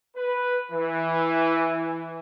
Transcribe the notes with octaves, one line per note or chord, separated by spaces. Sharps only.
B4
E3